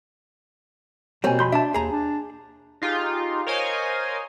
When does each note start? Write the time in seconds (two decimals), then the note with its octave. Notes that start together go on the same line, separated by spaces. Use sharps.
1.24 B2 G3 A#3 C4 C#5 G#5
1.39 F2 B5 C6 G6
1.52 D4 E5 A5
1.74 D#2 G#4 A#5
1.92 D4
2.82 D#4 F4 G4 G#4
3.47 A#4 C5 C#5 D#5 F5 G#5